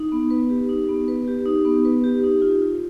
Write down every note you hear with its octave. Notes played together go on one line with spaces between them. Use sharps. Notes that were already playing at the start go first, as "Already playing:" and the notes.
Already playing: D#4
B3
B4
G4
D#4
B3
B4
G4
D#4
B3
B4
G4
D#4
F4
F4